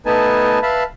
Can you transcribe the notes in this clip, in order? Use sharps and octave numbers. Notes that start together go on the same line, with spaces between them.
A3 B3 D#4 B4 G#5 A5
B4 E5 F5 A5 B5